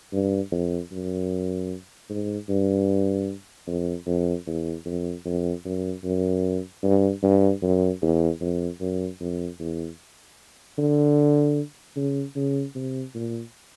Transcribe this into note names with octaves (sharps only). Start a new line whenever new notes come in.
G2
F2
F#2
G#2
G2
F2
F2
E2
F2
F2
F#2
F#2
G2
G2
F#2
E2
F2
F#2
F2
E2
D3
C#3
C#3
C3
A#2